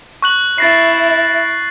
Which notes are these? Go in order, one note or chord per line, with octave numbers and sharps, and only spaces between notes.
C#6 F#6 F#7
E4 E5 A6 A#6 C7